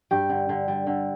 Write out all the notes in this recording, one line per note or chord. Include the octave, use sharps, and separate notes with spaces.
G2 G4
D3
D3
G3
D3